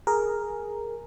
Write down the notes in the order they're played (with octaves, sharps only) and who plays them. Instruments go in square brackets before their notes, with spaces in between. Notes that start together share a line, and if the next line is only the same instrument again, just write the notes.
[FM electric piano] G#4 A#4